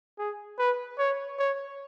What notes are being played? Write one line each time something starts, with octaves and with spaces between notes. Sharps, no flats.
G#4
B4
C#5
C#5